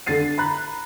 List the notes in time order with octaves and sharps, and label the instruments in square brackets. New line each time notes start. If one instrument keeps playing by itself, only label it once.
[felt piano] D3 D4 A6 C7 D#7
A#5 B5 F#6